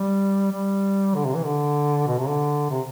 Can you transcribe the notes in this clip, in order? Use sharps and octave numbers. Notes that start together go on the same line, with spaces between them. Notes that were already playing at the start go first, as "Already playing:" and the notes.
Already playing: G3
G3
D3
C3
E3
D3
B2
C3
D3
C3